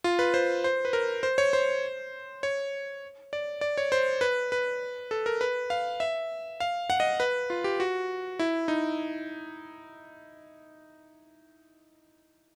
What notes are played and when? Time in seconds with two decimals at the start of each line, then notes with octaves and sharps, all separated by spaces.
0.04 F4
0.19 B4
0.34 C5
0.64 C5
0.85 B4
0.93 A#4
1.23 C5
1.38 C#5
1.53 C5
2.43 C#5
3.33 D5
3.61 D5
3.78 C#5
3.92 C5
4.21 B4
4.52 B4
5.11 A4
5.26 A#4
5.41 B4
5.70 F5
6.00 E5
6.60 F5
6.90 F#5
7.00 D#5
7.20 B4
7.50 F4
7.64 G4
7.80 F#4
8.39 E4
8.68 D#4